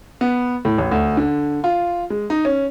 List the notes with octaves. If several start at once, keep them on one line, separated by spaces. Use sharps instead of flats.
B3
A2
A1
D2
D3
F4
G#3
D#4
C#4